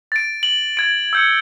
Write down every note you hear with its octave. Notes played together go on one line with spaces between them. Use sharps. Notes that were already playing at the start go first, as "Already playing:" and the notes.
A6 D7
F#7
G#6 D7
E6 G6 C#7